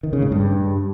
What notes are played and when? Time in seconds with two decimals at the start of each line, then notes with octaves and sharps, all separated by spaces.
0.03 D#3
0.13 C#3
0.22 A2
0.32 G2